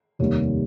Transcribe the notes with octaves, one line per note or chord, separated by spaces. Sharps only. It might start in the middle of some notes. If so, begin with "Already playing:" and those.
F1 D#2 D#3 G3 C#5